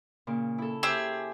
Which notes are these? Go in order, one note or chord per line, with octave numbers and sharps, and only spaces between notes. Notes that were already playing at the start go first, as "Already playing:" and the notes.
A#2 C#3
E4 A4
G4 G#4 C5 E5